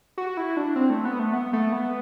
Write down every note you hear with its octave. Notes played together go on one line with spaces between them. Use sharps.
F#4
E4
D4
C4
A3
B3
A3
B3
A3
B3